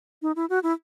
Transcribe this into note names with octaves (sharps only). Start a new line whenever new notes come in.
D#4
E4
F#4
E4